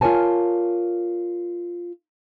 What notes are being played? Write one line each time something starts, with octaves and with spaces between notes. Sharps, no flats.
F4 A#4 C5 C#5 G#5 A5